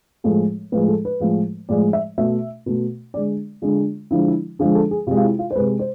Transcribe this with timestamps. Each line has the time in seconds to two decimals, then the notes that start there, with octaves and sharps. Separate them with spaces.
0.24 A2 F3 G#3 A4
0.72 A2 F3 G#3 B4
0.88 A4
1.05 B4
1.20 A2 F3 G#3
1.69 A2 F3 G#3 D5
1.93 E5
2.18 B2 A3 E5
2.66 B2 A3
3.14 D3 G#3 D5
3.62 D3 G#3 F4
4.11 D3 F3 G#3 E4
4.27 E4
4.59 D3 F3 G#3 G#4
4.75 A4
4.91 G#4
5.07 C3 G#3 F4
5.17 F4
5.24 E4
5.39 F4
5.51 C5
5.55 G#3 B4
5.60 C3
5.79 C5